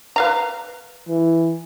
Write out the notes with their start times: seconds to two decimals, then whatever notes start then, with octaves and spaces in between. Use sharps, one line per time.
0.16 B4 F5 A#5
1.08 E3